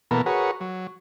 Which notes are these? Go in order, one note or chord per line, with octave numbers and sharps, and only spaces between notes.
B2 E3 A#3 B3 A4 A#4
F#4 G#4 A#4 B4 C#5 F#5
F#3